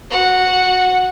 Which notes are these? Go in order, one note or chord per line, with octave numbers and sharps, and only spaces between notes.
F#4 F#5